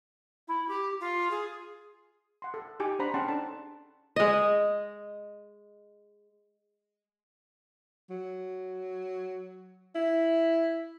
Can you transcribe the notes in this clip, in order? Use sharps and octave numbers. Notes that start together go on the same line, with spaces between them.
E4
G4
F4
G#4
F#5 C6
A4
D#4 G4 G5 G#5 D6
D4 C5 F#5 A#5 B5
C#4 G#4 F#5 G5 A5 C6
D4 D#4 A4 A5
G#3 D#5
F#3
E4